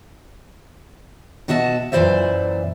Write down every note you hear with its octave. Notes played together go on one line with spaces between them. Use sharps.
B2 F#4 D#5 E5 A5
F#2 A#2 E3 C5 D5 E5